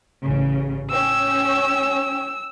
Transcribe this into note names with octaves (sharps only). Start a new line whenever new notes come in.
A1 C#3
C#4 G5 E6